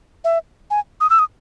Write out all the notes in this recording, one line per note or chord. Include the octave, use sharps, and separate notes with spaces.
E5
G#5
D#6
E6
D#6